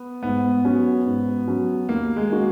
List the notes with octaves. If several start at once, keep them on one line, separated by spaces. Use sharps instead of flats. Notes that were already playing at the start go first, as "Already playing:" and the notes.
Already playing: B3
G#2 B3
F#3 C#4 F#4
G#2
F#3 C#4 F#4
D#2 A#3
G#3
D#3 A#3 C#4 F#4